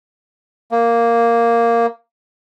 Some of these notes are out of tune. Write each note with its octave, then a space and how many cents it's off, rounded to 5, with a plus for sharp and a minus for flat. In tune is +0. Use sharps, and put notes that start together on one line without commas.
A#3 -5